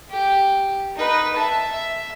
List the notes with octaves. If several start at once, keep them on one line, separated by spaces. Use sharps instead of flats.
G4
D#4 B4
E5 A5
E5